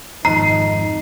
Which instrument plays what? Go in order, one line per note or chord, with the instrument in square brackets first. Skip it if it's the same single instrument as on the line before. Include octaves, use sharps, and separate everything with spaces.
[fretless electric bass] G#1 F2 [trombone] D#4 [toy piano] A#5 [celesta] C7